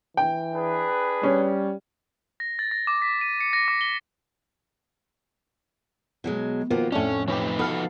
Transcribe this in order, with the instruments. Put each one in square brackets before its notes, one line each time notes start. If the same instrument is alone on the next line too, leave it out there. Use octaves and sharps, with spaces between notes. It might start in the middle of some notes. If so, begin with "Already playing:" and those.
[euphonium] E3 [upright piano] G5
[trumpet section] D4 G#4 B4
[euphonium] G3 [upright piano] C#4
[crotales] A#6
A6
A#6
D6
B6
D#7
C#7
A#6
D6
G7
[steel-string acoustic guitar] B2 F#3 G#3
[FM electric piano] B2 F3 [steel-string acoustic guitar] D#3 A#3 B3
[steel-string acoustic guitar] F2 A2 [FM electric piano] A3 D4 [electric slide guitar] C#4
[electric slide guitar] F3 D#4 B4 [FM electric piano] C#4 G4
[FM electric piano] B3 F5 [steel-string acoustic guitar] F#4 A4